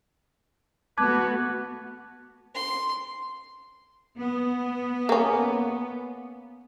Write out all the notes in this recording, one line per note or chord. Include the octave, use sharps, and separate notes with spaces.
A3 B3 F#4 B4 A5 D6 G#6
C6
B3
A#3 C#4